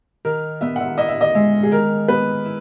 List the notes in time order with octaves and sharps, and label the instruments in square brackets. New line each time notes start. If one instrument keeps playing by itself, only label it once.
[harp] D#3 [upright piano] A#4
[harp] B3 [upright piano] E5
[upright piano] F#5
E5
[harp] E4 [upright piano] D#5
[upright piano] E5
D#5
[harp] G#3 [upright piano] E5
[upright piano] G#4
[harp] D#3 [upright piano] A#4
[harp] B3 [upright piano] B4
[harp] E4